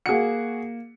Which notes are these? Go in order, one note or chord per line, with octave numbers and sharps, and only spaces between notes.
A#3 F#4 G#4 C#7